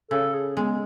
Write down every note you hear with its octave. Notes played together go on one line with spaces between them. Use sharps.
C#3 A4
G#4
G#3 B3